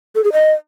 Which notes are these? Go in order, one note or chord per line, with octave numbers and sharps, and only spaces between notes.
A4
G#4
D#5